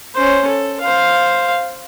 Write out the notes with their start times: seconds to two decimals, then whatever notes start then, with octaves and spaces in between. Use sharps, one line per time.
0.14 C#4 C5
0.47 A4
0.80 C5 F5